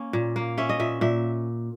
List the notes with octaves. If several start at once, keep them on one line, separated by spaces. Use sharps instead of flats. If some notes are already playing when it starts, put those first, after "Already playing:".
Already playing: A#3 C#4
A#2
A#3
C#4 E5
D#5
A#2 E5
A#2 E5